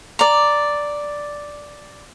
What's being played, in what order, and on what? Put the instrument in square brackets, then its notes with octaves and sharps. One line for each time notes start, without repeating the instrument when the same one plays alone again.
[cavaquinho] D5 A#5